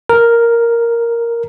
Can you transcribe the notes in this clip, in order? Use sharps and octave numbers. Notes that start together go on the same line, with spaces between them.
A#4